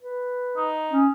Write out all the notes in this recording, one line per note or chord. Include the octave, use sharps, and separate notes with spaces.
B4
D#4
C#4